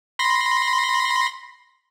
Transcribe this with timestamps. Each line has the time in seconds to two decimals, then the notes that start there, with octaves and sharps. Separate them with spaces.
0.19 B5 C6 A#6